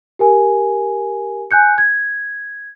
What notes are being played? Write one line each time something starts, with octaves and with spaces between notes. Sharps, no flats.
G4 A#4 G#5
G#5 F#6 G6 C#7
G#6